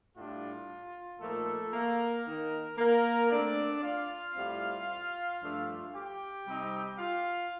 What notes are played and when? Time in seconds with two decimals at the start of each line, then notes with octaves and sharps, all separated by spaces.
0.15 A2 G3 D4 F4
1.20 A#2 F3 A3 A#3 D#4 A4
1.73 A#3 A#4
2.25 D#3 A#3 D#4
2.78 A#3 A#4
3.30 D3 A3 C4 D4 D5
3.83 F4 F5
4.35 A2 G3 C4
5.41 G2 F3 A3 D4
5.93 G4 G5
6.46 C3 G3 C4 D#4
6.99 F4 F5